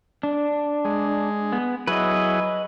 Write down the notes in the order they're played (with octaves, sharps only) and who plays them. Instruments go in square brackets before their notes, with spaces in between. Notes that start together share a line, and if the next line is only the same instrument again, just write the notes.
[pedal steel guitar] D4
[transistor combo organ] G#3
[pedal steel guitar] B3
[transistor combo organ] F#3 E4 G#4 [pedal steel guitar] B4 D#5